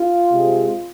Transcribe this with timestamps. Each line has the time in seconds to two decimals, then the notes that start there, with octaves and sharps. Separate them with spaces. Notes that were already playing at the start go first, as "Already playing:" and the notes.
Already playing: F4
0.31 C3 G#3 C4